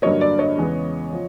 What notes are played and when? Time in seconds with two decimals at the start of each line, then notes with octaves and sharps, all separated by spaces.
0.02 G2 D3 F#3 A#3 C#5 D#5
0.21 D5
0.39 C#5 D#5
0.58 E2 C#3 E3 G#3 B3
1.13 F3